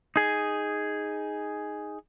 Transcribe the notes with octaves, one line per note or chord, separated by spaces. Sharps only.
D#4 G#4